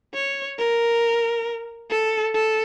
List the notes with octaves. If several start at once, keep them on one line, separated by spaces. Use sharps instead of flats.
C#5
A#4
A4
A4